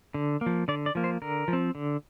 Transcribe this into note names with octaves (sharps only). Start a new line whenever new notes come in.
D3
A#3
F3
D3 D5
D5
F3 A#3
C5
D3 A#4
F3
C4
D3